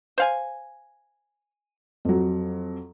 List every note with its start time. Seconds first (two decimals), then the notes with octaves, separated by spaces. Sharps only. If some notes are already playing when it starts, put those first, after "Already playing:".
0.18 C5 F5 G#5
2.05 F2 F#3